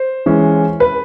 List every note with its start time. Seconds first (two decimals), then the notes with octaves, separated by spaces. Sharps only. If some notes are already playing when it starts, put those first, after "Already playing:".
Already playing: C5
0.26 E3 G#3 C#4
0.80 B4